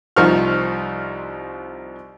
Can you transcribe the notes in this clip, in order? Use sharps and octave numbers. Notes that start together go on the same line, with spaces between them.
C2 F3 D#4 C5 C#6 F6